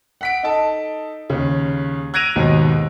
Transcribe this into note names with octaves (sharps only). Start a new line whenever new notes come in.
F#5 B6 D7
D#4 A4 A5
D#2 C#3
F#6 G#6 A#6 D7 D#7 F7
D#2 G#2 B2 D#3